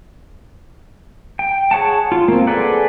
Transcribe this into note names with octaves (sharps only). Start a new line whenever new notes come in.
G5
G#4 C#5 F#5 A5
F4
A#3 C4
G#4 A4 B4 D5 F#5